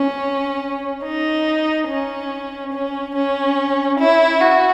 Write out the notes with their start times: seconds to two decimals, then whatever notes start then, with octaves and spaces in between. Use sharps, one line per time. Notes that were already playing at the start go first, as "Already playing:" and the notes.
Already playing: C#4
1.03 D#4
1.88 C#4
2.73 C#4
3.15 C#4
3.99 E4
4.41 F#4